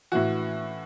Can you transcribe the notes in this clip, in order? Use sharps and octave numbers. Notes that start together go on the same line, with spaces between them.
A2 E3 F#4